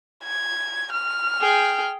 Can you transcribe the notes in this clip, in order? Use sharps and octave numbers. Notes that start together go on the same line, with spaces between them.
G#6
F6
G#4 G5